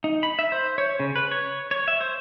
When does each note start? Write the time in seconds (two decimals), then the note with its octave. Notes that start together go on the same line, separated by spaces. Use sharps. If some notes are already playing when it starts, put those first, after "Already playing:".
0.04 D#4
0.23 B5
0.39 E5
0.52 C5
0.78 C#5
1.00 C#3
1.16 B4
1.31 C#5
1.71 C#5
1.88 E5
2.01 C5